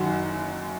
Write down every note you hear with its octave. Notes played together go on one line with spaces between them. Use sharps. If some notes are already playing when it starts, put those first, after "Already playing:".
Already playing: F#1 F#2 D#3 F#4